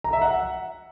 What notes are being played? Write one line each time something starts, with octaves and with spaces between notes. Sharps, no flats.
A#5
E5
F#5